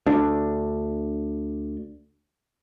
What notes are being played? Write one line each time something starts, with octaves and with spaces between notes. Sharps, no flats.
D2 D4